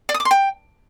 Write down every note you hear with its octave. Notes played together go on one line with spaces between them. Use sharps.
D5
D#6
D6
C6
G5